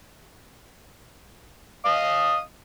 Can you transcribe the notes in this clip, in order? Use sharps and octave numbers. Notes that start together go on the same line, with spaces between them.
D#5 F5 D#6